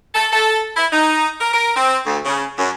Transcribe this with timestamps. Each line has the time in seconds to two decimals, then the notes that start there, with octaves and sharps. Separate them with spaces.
0.15 A4
0.31 A4
0.77 E4
0.92 D#4
1.40 A#4
1.53 A#4
1.76 C4
2.05 D2
2.25 C#3
2.57 F#2